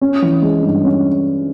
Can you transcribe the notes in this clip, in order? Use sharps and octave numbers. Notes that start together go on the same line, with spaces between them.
C#4
E3
G#3
G2
C#4